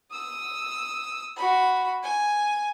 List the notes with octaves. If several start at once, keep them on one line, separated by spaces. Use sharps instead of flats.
D#6 E6
F#4 B5
G#5